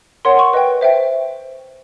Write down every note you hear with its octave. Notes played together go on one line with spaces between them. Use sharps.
A#4 C#5 F#5 C6
C#6
B4 D#5 G5
C5 E5 G5